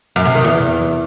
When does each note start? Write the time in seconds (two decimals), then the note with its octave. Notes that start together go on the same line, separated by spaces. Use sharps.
0.16 F#2
0.26 C3
0.35 D#3
0.45 E2